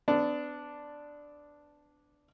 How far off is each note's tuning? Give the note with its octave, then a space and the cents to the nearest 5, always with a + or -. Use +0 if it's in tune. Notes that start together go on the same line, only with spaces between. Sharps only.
B3 +40 D4 +0